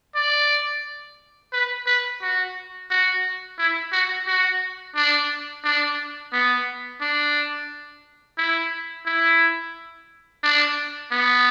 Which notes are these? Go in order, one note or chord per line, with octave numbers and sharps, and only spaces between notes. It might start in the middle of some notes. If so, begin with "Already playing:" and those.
D5
B4
B4
F#4
F#4
E4
F#4
F#4
D4
D4
B3
D4
E4
E4
D4
B3